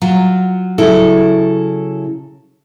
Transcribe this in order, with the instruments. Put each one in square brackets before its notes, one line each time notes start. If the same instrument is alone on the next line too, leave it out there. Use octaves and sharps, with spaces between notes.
[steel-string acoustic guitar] F#3 F4
C#3 F#3 E4 A4